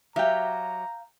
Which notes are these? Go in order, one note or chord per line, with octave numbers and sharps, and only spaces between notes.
F#3 G4 E5 F5 G5 A#5